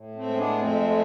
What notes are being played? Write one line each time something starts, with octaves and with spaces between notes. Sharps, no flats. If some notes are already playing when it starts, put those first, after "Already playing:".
Already playing: A2
A3 C4
G#3
B3 D4
F2 A3 C4